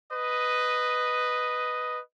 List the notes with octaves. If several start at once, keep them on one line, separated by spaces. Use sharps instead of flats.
B4 D#5